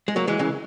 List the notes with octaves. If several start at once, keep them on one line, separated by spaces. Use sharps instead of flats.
G#3
F#3 A#3
E3 G#3
C#3 E3